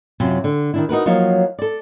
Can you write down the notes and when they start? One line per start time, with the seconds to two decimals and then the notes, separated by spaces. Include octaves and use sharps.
0.20 F#2 C3 F#3 F4
0.44 D3
0.74 D#3 D4 E4
0.89 D#4 F#4 A#4 B4
1.06 F3 F#3 A#3 D#4 C#5 F5
1.59 A4 D5